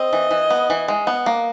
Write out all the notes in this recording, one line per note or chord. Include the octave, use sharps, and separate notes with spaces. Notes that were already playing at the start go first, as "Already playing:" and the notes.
Already playing: C4 D#5
E3
E3
B3
E3
G#3
B3
A#3